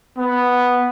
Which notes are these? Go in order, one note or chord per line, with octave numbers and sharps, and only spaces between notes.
B3